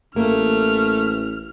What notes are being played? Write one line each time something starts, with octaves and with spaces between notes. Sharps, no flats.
A1 A3 A#3 F6